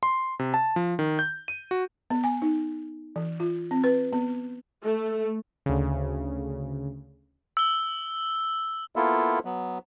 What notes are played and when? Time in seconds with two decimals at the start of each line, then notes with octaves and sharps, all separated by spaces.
0.03 C6
0.39 C3
0.54 A5
0.76 F3
0.99 D#3
1.19 G6
1.48 D#7
1.71 F#4
2.10 B3
2.24 G#5
2.42 D#4
3.16 E3
3.40 F4
3.71 C4
3.84 B4
4.13 B3
4.84 A3
5.66 D2 C#3
7.57 E6 G7
8.96 A#3 B3 E4 F4 A4
9.45 F#3 B3